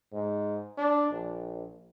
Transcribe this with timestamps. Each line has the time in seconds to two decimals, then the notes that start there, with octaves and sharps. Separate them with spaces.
0.13 G#2
0.77 D4
1.11 A#1